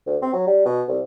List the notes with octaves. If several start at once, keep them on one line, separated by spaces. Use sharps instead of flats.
D2
C4
F#3
G3
B2
C2